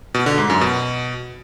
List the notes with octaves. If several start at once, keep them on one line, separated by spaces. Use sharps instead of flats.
B2
D3
G#2
F#2
B2